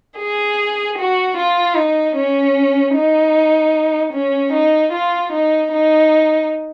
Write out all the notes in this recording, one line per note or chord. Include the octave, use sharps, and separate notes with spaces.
G#4
F#4
F4
D#4
C#4
D#4
C#4
D#4
F4
D#4
D#4